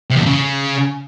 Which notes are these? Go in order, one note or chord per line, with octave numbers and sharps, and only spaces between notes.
C3
E2
A#2
C#3